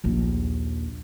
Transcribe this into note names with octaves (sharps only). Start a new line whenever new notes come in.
A#1 D#2